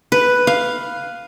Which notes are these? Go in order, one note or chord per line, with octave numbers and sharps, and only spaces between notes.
B4
F5